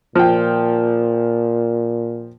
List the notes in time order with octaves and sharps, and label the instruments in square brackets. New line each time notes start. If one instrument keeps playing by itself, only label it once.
[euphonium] A#2 [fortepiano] F3 G5